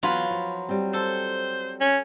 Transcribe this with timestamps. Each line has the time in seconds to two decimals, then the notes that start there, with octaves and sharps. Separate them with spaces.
0.03 E3 F#3 B3 F4 B4
0.31 F3
0.69 G3 C4
0.93 A4 C5
1.81 C#4